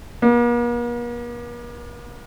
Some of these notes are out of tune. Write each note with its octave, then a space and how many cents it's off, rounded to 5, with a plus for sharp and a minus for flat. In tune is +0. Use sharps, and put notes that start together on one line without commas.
A#3 +45